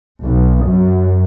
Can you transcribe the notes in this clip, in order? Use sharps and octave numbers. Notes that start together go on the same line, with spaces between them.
B1
F#2